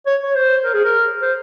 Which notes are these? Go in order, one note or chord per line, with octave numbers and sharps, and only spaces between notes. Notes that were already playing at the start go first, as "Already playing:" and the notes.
C#5
C#5
C5
A#4
G#4
A#4
C5